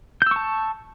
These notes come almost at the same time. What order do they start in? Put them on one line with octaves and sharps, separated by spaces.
G6 E6 C#6 A5